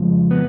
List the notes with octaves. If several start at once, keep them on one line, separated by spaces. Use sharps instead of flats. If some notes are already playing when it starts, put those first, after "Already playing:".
Already playing: F2 C#3 F3 G#3
B3